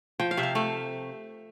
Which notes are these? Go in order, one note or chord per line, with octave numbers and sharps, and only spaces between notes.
F3 G5
F5
C3 E5
F5
A3 F5